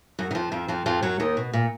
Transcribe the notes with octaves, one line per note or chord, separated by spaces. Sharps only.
F#2 F#3
D#3
F2 F3
F2 F3
F2 F3
F2 F3
F#2 F#3
D#2 D#3
B2
A#2